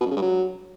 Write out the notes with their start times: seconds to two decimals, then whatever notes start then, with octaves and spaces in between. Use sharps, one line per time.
0.01 B2
0.06 F#2
0.11 C#3
0.17 G2
0.22 F#3